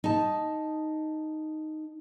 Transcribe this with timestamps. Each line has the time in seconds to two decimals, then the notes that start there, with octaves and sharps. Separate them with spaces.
0.04 D#4 A5